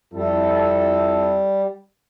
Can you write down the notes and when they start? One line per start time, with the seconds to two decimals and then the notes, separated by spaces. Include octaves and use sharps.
0.13 F2 G3 E4 A4